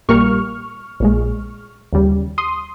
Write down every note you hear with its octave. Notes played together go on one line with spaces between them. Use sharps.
A#1 A#2 G3 A#3 C#6 F6
A#1 A#2 G#3
D#2 C#3 G3
C6 D#6